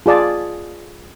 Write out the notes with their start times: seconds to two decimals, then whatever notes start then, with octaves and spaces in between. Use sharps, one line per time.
0.06 F4 G#4 D5 A5